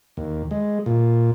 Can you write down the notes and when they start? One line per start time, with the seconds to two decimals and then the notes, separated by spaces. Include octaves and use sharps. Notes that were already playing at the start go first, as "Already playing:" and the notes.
0.17 D#2
0.51 G#3
0.86 A#2